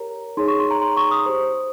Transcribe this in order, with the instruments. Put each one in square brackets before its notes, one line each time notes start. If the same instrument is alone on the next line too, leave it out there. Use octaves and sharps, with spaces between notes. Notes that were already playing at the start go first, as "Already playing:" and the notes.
Already playing: [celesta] G4 A#4 C#5 A#5
D#4 G#4 C#5 C6
C#6
C6
A#5
C6
C#6
D#6
G4 C5